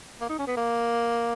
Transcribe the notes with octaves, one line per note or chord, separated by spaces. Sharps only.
A#3
D#4
C#4
B3
A#3